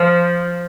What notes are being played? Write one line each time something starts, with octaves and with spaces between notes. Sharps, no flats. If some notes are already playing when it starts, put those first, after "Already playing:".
Already playing: F3